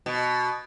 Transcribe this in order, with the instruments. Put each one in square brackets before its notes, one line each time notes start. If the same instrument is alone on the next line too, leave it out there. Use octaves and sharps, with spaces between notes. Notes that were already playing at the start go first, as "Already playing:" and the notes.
[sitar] B2